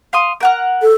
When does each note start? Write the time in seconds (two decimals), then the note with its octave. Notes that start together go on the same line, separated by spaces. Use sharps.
0.13 F5 C6 D#6
0.40 A#4 F#5 F6
0.82 A4